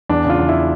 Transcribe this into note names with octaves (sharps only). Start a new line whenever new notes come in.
E2 D4
C#3 F4
E2
E4